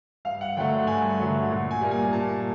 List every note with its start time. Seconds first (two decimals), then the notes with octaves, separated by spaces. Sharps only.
0.25 G2 F5
0.41 F#5
0.57 D3 F#3 A3 G5
0.87 G2 G#5
1.18 D3 F#3 A3
1.50 A#2
1.71 G#5
1.81 G3 A#3
1.91 G#5
2.13 A#2 A5